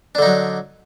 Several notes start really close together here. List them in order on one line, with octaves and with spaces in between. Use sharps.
D4 D3 D#4 F#3